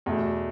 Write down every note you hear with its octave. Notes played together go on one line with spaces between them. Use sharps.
E2 B2 A3